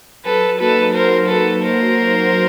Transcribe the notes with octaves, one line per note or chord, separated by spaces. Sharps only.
F#3 A4 B4
A#3 D#4 F#4 A4 B4
F#3 A#4 C5
A#3 D#4 F#4 A4 B4
F#3 A#4 C5
A#3 D#4 F#4
F#3